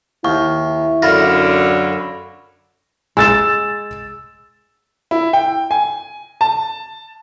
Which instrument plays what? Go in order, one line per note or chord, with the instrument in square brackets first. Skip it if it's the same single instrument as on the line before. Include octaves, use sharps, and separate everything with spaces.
[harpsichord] D#2 [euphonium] E4 [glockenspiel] C#6
[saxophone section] F#2 D3 [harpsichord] F4 [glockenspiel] B5 A#6
[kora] G#3 [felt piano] E6 A6 E7
[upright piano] E4
G5
G#5
A5